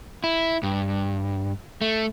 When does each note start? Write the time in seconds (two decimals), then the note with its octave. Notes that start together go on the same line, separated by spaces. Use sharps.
0.24 E4
0.63 G2
1.81 A3